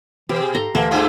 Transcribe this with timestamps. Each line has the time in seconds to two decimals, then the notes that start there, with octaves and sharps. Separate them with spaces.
0.29 B2 E3 G4
0.42 G#4
0.55 G#2 A4 A#5 C6
0.75 D2 E3 A#3 A4 E5
0.91 G2 D3 F4 G#4